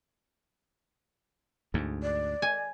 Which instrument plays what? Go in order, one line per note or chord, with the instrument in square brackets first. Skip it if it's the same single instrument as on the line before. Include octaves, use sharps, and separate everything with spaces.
[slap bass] D2 G#2
[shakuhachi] D5
[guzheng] G#5